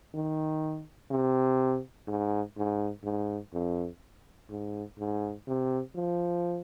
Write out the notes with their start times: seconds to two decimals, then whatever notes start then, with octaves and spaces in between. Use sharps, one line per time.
0.14 D#3
1.11 C3
2.08 G#2
2.57 G#2
3.04 G#2
3.53 F2
4.50 G#2
4.99 G#2
5.47 C3
5.95 F3